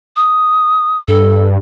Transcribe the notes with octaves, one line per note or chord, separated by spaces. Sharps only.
D#6
G2 A4